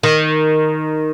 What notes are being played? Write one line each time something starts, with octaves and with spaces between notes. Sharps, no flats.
D#3